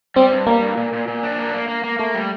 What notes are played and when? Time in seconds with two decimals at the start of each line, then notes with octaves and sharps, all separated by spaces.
0.16 G3 C4
0.32 G2
0.47 G3 A#3
0.62 G2
0.77 A#2
0.93 A#2
1.08 A#2
1.23 D4
1.38 A#3
1.54 A#3
1.68 A#3
1.84 A#3
1.99 A3 A#3
2.15 G3